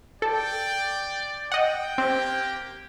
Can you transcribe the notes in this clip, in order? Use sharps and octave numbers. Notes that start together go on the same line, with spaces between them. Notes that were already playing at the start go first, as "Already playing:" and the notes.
A4 D5 G5
D#5 F#5 G5
A#3 C4 G4